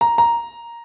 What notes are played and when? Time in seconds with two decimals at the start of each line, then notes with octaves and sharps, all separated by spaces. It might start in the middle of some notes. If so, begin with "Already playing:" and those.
0.01 A#5
0.18 A#5